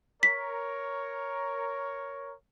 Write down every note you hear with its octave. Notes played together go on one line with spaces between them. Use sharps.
A#4 C#5 B6